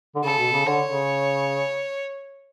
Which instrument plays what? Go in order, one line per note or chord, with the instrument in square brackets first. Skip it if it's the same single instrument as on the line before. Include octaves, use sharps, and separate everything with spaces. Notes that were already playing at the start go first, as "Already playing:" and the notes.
[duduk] D3
[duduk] C#3 [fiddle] A4
[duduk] B2
C#3
[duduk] D3 [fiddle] C#5
[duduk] C#3